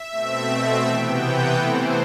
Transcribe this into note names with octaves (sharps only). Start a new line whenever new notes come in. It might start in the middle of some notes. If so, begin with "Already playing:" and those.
Already playing: E5
B2 A3 C4
C3 E3 B3 G5
F#5
C3 E3 A3 C5